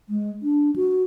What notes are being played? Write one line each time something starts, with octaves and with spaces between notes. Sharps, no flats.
G#3
D4
F#4